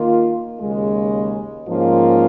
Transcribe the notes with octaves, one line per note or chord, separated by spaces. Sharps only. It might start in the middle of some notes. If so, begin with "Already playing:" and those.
Already playing: D#3 A#3 F4
D#2 C#3 G#3
G#2 F3 A#3 C#4 F4